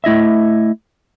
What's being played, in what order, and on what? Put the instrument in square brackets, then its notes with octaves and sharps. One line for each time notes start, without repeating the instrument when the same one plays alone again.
[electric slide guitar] A3 E4 D#5 E5